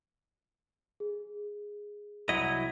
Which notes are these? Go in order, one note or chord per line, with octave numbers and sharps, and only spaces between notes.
G#4
C2 F#3 E4 D#5